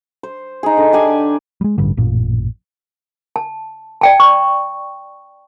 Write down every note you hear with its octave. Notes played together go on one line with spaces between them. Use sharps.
C5
D#4 G#4
D3
D4 G4 D5 G#5
G3 G#3
A1 G2 D3
A1 F#2 A#2
A5
D5 G5 A5
C#6